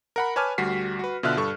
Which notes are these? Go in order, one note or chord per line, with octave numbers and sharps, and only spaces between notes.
A#4 F#5 B5
B4 C#5 G#5 A5 D6 F6
D2 G3 F#4 B6 C7
F#4 B4
B2 D3 F4 E5 F6 F#6
G2 A4 C#6